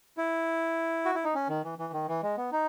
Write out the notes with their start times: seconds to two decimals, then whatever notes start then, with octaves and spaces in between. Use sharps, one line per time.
0.17 E4
1.05 F#4
1.15 E4
1.25 D#4
1.35 C#4
1.49 D#3
1.64 E3
1.79 E3
1.93 D#3
2.08 E3
2.23 G#3
2.37 B3
2.52 D#4